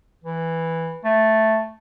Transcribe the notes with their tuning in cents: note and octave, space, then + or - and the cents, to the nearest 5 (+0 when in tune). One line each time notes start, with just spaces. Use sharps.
E3 -5
A3 +0